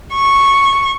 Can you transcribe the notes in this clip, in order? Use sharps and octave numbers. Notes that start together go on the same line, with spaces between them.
C#6